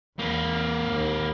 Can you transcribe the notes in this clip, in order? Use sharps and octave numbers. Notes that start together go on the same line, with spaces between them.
E2 A#3 B4
D#2